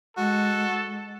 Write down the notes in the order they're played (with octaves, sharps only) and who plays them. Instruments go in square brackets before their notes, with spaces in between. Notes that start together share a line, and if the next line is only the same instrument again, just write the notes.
[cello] G#3 [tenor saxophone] F#4 [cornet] A4